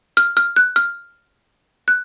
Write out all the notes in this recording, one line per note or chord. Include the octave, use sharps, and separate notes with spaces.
F6
F6
F#6
F6
F#6